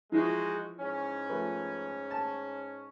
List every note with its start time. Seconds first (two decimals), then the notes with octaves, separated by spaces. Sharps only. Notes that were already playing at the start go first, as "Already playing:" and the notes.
0.12 E3 F3 G#3 D#4 E4 F#4
0.79 G#2 C#4
1.29 F3 A3 B4
2.10 G#5 A5